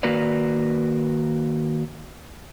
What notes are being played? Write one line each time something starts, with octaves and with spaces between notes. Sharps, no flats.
D#3 A#3 F#4 A#4 B4 D5